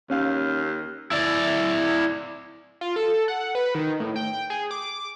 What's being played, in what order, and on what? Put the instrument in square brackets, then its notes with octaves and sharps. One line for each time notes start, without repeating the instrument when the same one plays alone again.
[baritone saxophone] D#2 [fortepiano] C#4 F5
[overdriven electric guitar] E4 D5
[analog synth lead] F4
A4
F#5
B4
D#3
A2
G5
G#4
D6